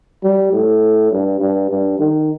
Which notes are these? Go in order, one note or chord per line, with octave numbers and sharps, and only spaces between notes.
G3
A2
G2
G2
G2
D#3